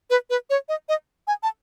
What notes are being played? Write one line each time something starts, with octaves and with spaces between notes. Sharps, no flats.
B4
B4
C#5
D#5
D#5
G#5
A5